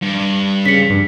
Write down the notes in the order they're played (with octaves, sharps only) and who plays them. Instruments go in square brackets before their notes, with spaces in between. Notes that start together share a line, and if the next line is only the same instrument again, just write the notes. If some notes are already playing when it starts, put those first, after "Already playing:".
[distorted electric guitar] G2
[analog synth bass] C#3 [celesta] B6 C#7
[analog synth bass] G2